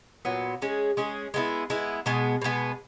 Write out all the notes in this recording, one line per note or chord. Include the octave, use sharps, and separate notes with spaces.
A#2 F#3 B3
G#3 C#4 G#4
G#3 C#4 G#4
G#3 B3 E4
G#3 B3 E4
B2 G#3 B3
B2 G#3 B3